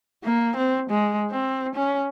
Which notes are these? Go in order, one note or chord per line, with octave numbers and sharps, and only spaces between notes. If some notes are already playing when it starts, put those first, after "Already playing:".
A#3
C4
G#3
C4
C#4